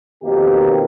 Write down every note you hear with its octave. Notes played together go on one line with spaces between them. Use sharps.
F2 B2 D#3 A#3 G4